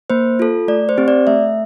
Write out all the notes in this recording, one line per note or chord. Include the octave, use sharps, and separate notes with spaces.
A#3 C5
F4 A4
A3 D5
C5
C4 G4
D5
A3 E5